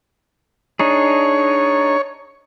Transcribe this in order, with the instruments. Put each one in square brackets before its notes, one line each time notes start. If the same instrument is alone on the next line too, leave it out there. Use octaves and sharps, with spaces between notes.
[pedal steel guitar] D4 D#4 G#4 [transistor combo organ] C#5